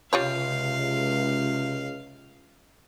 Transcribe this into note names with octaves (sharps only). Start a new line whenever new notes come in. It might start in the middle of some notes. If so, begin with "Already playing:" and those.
C#2 C3 F4 G4 C#5 F5